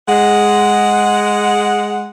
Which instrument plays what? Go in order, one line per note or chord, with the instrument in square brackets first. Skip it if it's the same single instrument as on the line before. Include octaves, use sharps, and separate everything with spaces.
[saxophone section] G#3 F#5